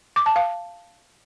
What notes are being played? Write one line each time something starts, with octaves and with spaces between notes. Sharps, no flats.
D6
A5
F5